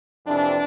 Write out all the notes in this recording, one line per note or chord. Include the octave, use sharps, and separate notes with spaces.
F2 C3 E3 D4